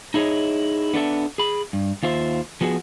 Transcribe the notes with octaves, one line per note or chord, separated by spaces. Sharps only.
D#4 E4 G#4 C#5 D#5
B3 D4 A4 E5
G#4 B5
G2
D#2 F4 C5 E5
F3 B3 F#4 G#4